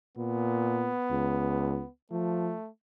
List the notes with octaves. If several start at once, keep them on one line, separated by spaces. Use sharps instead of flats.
A#2 B3
C#2
F3 A3